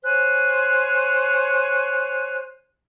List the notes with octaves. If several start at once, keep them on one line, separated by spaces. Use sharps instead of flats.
C5 C#5 G#5 F#6